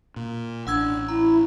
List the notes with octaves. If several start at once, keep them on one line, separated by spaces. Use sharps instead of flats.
A#2
A1 D4 F#5 E6 G#6
E4 A#5